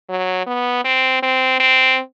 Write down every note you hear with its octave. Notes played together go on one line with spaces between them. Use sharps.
F#3
B3
C4
C4
C4